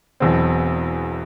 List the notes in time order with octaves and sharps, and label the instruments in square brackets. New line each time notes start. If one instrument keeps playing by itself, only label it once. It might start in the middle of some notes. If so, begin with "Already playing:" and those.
[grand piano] E1 E2 B2 F#3 C4